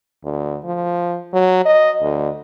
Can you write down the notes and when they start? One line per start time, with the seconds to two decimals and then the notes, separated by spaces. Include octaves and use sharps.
0.24 D2
0.65 F3
1.33 F#3
1.65 D#5
2.02 D2